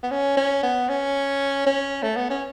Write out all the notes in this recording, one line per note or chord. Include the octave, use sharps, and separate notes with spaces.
B3
C#4
C#4
B3
C#4
C#4
A3
B3
C#4